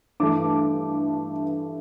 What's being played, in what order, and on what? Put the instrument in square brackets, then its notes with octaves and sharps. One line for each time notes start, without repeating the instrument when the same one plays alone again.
[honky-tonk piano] G2 E3 A3 D6